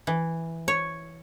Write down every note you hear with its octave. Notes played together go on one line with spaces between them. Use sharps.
E3
C#5